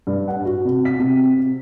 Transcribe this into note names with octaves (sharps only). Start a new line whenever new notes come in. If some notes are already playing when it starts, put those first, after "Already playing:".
G2
F#5
F#4
C3
B6
C3